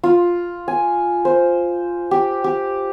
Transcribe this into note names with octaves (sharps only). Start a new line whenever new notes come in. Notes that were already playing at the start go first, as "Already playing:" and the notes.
F4
G#5
C5
G4
G4